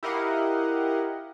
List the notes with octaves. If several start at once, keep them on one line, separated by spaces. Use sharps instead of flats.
E4 G4 A#4 D#5 F5 F#5